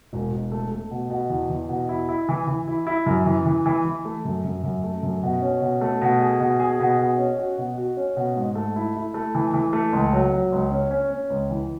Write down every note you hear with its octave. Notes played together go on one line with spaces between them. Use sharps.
E1
E1
A3
A3
B2
B2
E2
E2
B2
E4
E4
E3
E3
E4
E4
F#2
E3
E3
E3
E3
A3
F#2
F#2
F#2
A3
F#2
B2
C#4
B2
A3
B2
G#4
B2
G#4
B2
B2
C#4
F#4
B2
F#4
C#4
B2
G#2
A3
E4
E4
A3
E3
E3
A3
C#2
F#3
F#3
C#2
C#4
C#4
C#4
C#2
E3